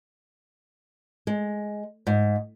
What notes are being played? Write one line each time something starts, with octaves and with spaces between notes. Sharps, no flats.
G#3
G#2